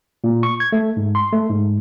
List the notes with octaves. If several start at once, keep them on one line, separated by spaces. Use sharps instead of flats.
A#2
C#6
G#6
A3
G#2
C6
A3
G#2